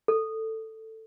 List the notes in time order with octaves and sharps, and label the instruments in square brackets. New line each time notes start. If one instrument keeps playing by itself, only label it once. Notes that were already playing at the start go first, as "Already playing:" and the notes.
[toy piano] A4